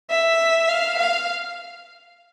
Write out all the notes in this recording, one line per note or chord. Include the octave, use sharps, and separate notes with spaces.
E5
F5
F5